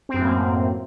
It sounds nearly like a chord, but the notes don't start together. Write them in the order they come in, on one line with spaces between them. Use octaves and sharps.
C4 F#2 A2 A#3